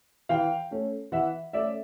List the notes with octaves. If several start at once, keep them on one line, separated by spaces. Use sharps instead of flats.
E3 F5 G5
A3 C#4
E3 E5 F#5
A3 C#4 D5 E5